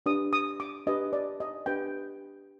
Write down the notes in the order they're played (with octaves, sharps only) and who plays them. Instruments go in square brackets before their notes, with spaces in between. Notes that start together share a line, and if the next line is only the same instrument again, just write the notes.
[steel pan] D4 G4 B4 D#6
D#6
D6
D4 G4 B4 D#5
D5
D#5
D4 G4 B4 G5